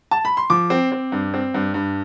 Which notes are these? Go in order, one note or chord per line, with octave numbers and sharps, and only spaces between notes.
A5
B5
C6
F3 D6
C4
C4
G2
C4
G2
G2